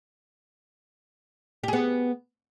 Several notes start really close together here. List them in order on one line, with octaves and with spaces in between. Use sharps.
G4 G#4 B3